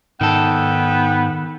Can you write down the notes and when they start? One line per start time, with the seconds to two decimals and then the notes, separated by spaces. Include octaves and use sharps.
0.21 G#2 D#3 B3 A4 G5